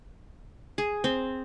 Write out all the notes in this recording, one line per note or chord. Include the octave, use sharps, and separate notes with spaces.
G#4
C4